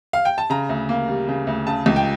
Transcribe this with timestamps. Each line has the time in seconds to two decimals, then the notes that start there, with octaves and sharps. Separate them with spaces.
0.13 F5
0.25 G5
0.38 A5
0.50 C#3 A#5
0.69 D2
0.89 A#3
1.08 G3
1.28 C#3
1.47 D2
1.67 C#3 A5
1.86 C#2
1.96 G5